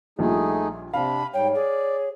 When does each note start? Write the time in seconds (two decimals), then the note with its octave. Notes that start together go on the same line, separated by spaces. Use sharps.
0.19 A#1 A#2 G3 A3 D#4 G#4
0.93 C3 C4 D4 F5 B5
1.34 G#2 G3 C#5 G5
1.55 G#4 D5